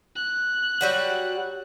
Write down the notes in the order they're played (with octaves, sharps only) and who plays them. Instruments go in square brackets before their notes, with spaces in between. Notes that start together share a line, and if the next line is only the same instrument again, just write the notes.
[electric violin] F#6
[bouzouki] F#3 G3 F#4